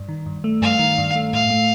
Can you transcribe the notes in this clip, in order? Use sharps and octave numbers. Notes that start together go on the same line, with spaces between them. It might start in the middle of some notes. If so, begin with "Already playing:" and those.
Already playing: G2
D#3
G2
A3
G2 F5
D#3
G2
A3
A2 F5
A3